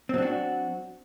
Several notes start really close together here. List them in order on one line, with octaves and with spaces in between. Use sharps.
C4 F#3 D4 F#4